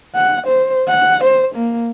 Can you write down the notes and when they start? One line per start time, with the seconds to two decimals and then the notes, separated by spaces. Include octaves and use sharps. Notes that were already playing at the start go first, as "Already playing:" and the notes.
0.15 F#5
0.47 C5
0.88 F#5
1.24 C5
1.55 A#3